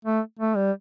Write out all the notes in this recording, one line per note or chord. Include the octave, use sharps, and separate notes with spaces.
A3
A3
G3